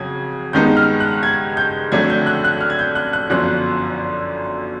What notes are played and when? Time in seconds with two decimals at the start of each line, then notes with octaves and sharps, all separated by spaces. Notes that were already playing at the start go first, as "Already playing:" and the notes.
Already playing: F2 C#3 F#3 G#6
0.53 G2 D#3 G#3 B3 D#4 G6
0.77 F6
1.00 F#6
1.23 G#6
1.57 G6
1.92 F2 D3 F#3 A3 D4 G#6
2.10 G6
2.27 F#6
2.44 F#6
2.61 F6
2.70 G#6
2.79 G6
2.95 F#6
3.13 F#6
3.30 G1 F#2 D3 F3 F#6